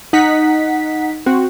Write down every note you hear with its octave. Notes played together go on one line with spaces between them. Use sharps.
D#4 F#5 B6
C4 F#4